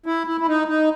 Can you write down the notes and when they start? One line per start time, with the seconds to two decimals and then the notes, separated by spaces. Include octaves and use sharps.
0.06 E4
0.27 E4
0.41 E4
0.48 D#4
0.68 D#4